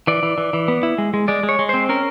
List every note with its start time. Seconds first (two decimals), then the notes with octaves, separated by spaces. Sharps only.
0.07 E3 D5
0.23 E3
0.38 E3
0.53 E3
0.68 B3
0.83 E4
0.98 G#3
1.14 G#3
1.28 G#3 D5
1.43 G#3
1.49 C#5
1.59 G#3
1.69 C4 C5
1.89 C#4 A#4